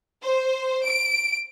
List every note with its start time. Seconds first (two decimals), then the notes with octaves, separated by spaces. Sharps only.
0.22 C5
0.85 D7